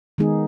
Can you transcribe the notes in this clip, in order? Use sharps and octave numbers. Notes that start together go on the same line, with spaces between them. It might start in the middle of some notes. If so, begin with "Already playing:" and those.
D#3 G#3 B3 D#4 G#4